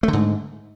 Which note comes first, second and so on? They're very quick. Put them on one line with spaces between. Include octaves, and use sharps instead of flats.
A3 D3 G#2